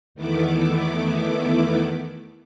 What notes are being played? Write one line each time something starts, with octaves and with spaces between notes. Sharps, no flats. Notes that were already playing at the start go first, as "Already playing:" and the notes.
E2 D#3 A3 B3 E4 D6